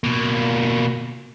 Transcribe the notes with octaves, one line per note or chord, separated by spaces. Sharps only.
B2 A#3